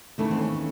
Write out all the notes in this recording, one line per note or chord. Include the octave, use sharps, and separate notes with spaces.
D#2 C#3 E3 A3
C4
C#4